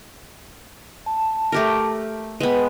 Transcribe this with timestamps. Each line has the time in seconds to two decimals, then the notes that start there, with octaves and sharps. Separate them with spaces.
1.06 A5
1.52 A3 G4 A#4
2.40 G#3 B3 B4 G5